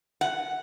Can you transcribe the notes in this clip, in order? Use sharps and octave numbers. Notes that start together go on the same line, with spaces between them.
F#5